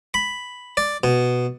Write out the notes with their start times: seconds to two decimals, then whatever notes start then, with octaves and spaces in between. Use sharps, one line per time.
0.14 B5
0.77 D5
1.04 B2